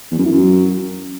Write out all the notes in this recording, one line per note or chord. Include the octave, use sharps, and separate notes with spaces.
E2
F#2
E3
F#2